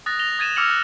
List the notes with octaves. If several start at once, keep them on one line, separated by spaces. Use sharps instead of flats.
D#6 F#6 A6 A#6
A#6 F7 G7
D#6 G#6 A6 D#7 E7
D6 E6 F6 C#7 F7 F#7
F#6